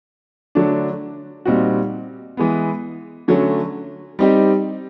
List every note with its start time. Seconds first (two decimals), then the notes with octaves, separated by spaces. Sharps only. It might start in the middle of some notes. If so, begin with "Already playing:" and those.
0.55 D3 F#3 A3 D4
1.45 A#2 G3 C4 D#4 F#4
2.37 E3 G#3 B3
3.28 D3 F#3 A3 C#4
4.19 G3 C4 D#4 G4